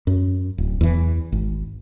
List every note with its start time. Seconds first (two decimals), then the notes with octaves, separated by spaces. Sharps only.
0.07 F#2
0.58 D1
0.81 E2 E3
1.32 G#1